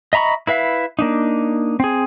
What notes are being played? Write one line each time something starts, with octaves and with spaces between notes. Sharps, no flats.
D#5 E5 A#5 B5 C#6
E4 B4 E5 F5
A#3 D4 D#4
C4 G#4